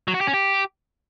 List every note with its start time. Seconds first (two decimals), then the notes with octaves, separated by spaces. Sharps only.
0.08 F#3
0.14 F#4
0.21 G4
0.27 C#4
0.34 G4